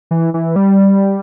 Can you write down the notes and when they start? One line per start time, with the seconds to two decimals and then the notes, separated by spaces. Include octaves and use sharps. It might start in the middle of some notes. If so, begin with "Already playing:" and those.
0.11 E3
0.34 E3
0.56 G3